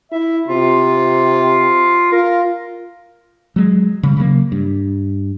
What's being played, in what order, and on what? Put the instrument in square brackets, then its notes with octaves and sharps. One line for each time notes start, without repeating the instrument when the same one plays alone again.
[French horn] E4 [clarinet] E5
[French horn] C3 [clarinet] F4
[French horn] F4 [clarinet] A#4
[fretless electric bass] F#3 G#3
C#3 G3
C#3 F#3 G3 A#3
G2